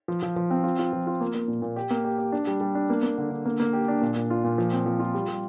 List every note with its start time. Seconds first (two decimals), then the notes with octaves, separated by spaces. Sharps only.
0.08 F3
0.22 F3
0.36 F3
0.51 C4
0.63 F4
0.79 F4
0.93 F3
1.07 F4
1.21 A#3
1.34 A#3
1.48 A#2
1.62 A#2
1.76 G4
1.90 A#3
2.04 G4
2.18 G4
2.32 D4
2.47 G3
2.61 G3
2.75 D4
2.90 A#3
3.03 A#3
3.18 D3
3.31 D3
3.46 A#3
3.60 A#3
3.73 G4
3.88 D4
4.02 A#2
4.16 A#2
4.30 F4
4.44 A#2
4.58 F3
4.72 C4
4.86 F3
5.00 F4
5.15 G3
5.29 G3